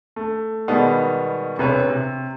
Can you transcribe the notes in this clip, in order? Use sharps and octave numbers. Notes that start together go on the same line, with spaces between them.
A3
B2 D#3 G3 G#3 B3
E1 C3 B4 C#5
C3